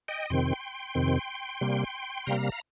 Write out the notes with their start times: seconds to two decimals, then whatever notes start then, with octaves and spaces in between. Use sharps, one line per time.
0.08 D#5 G5
0.30 F2 C3 D#3 C4 G5 C6
0.95 F2 C3 D#3 C4
1.61 C3 G3 A#3
2.26 C3 G3 A#3 F5 A#5
2.52 F5